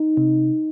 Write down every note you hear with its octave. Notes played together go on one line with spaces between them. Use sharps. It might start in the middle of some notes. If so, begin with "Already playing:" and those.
Already playing: D#4
C3